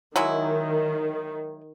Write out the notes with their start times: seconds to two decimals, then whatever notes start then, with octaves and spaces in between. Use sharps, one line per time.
0.16 D#3 F#3 G#3 E4